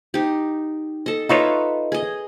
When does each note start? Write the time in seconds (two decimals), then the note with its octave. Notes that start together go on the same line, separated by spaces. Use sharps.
0.14 D#4 G4
1.06 A4 D#5
1.29 D#4 F4 A4 B4 C#5 E5
1.92 G#4 D#5